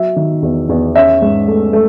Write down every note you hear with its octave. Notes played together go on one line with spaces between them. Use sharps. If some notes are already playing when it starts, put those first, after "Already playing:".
Already playing: F#3 E5
D#3
E2
E2
C#4 E5
G#2
A3
A3